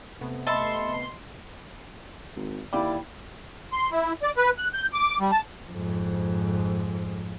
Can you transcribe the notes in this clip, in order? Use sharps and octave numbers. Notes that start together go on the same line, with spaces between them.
C3 A3 B3
A4 D#5 E5 A5 B5 C6
G#1
D#2 G3 E4 D5 F5 D6
C6
E4
D5
B4
F#6
G6
D6
G3
A5
F2 G#2